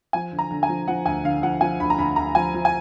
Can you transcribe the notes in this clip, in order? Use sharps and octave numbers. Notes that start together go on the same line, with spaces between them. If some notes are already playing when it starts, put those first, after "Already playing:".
F3 G#5
D3
A#5
D3
G#5
F3
F3 F#5
D2 G#5
D3 F5
F3 F#5
F3 G#5
D2 B5
A#5
D2 B5
D2 A#5
F3 G#5
F3
G#5